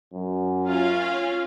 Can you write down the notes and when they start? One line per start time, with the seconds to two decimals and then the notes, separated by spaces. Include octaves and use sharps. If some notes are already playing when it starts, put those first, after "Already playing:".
0.14 F#2
0.68 C#4 F4 F5